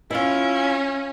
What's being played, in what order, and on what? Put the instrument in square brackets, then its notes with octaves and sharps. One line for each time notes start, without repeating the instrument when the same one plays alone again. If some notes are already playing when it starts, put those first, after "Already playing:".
[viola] C#4 [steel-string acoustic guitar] E4 F4